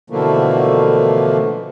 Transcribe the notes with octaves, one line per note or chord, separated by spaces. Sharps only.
B2 D3 E3 F3 A3 A#3